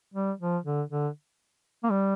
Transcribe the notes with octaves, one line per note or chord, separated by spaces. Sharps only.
G3
F3
D3
D3
A#3
G3